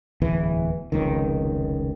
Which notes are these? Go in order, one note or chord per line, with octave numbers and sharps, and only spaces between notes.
D1 E2 E3
F1 C#2 D#3